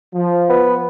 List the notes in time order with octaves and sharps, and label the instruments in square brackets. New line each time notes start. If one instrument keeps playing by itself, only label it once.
[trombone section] F3
[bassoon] B3